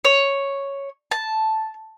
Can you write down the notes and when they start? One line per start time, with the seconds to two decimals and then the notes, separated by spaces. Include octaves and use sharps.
0.05 C#5
1.11 A5